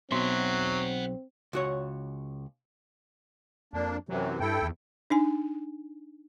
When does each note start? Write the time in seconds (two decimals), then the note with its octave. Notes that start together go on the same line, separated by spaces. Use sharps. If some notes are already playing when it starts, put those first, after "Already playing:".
0.11 B1 B2 F#3 C4 E5 F#5 C6
1.53 C#2 F#4 C#5
3.73 F2 A#3 D4
4.09 F#2 C3 E3 F#3
4.40 G2 E4 A4 G5
4.62 E2
5.10 D4 D#4 G#5